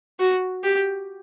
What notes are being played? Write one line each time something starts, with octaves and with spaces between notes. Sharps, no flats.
F#4
G4